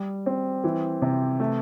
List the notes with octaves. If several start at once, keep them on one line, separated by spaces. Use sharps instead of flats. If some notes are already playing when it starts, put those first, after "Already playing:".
Already playing: G3
C4
E3
C3
A3